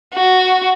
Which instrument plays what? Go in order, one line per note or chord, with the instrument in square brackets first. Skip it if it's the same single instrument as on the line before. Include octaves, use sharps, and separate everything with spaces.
[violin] F#4